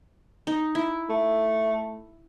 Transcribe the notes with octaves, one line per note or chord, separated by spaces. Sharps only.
D#4
E4
A3